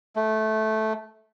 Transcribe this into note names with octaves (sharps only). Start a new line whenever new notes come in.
A3